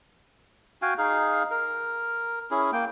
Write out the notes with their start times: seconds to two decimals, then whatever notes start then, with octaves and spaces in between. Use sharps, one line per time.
0.82 F#4 F5 G5 G#5
0.98 D#4 G#4 F5
1.51 A#4
2.51 C#4 E4 G#4
2.73 A#3 G5